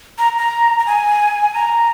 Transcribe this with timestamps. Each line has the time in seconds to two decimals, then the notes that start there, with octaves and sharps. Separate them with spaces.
0.19 A#5
0.38 A#5
0.79 A#5
0.86 G#5
1.54 A#5